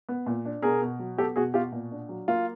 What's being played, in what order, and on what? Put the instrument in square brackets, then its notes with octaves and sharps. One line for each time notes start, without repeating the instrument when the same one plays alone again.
[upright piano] B3
A#2
D4
[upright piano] B2 [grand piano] G#4 A#4
[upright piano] B2
F#3
[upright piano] B3 [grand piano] G4 A4
[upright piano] B2 [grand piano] F#4 G#4
[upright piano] B2 [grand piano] F4 G4
[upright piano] A#2
D4
F#3
[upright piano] A#3 [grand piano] F4